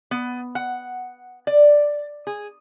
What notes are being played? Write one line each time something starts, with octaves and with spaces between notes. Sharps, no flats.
B3
F#5
D5
G#4